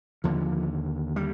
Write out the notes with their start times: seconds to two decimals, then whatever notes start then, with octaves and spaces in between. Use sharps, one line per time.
0.24 D#2 D3 F3
1.16 G3